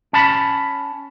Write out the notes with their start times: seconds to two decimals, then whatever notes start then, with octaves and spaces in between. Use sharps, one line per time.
0.13 C#4 A5 B5